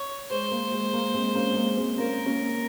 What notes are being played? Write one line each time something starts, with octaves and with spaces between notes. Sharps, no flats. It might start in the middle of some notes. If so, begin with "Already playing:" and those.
Already playing: C#5
G#3 C5
A#3
G#3
A#3
G#3 C4
A#3 C#4
G#3
A#3
G#3 C4
A#3 C#4 A#4
A#3 C#4